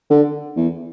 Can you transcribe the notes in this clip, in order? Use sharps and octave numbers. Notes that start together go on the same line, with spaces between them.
D3
E2